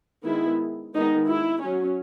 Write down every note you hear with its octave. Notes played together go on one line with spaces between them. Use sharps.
D#3 G#3 B3 E4
D#3 G#3 B3 D#4
E4
F#3 C#4